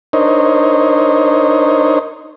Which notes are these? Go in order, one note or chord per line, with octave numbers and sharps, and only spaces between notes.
D4 D#4 A#4 C5 C#5 D#5